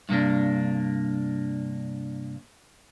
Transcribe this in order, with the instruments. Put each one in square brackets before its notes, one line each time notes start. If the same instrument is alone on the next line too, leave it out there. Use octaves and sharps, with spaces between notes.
[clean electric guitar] G2 C3 A#3 D4